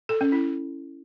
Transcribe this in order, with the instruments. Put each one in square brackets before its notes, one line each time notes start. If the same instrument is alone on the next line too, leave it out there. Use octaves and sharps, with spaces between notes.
[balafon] A4
C#4
E4